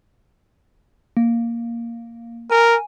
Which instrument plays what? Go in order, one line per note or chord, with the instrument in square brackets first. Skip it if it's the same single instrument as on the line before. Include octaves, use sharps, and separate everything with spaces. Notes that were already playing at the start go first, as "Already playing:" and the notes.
[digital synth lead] A#3
[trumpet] A#4 [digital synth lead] G#5